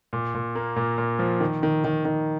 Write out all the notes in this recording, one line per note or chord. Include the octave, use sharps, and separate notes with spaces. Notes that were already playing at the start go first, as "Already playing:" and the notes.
A#2
A#2
A#3
A#2
A#2
F3
D#3
D#3
D#3
D#3